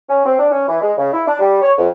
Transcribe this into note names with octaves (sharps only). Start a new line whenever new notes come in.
C#4
C4
D4
C#4
E3
G#3
C#3
E4
D4
G3
C#5
F2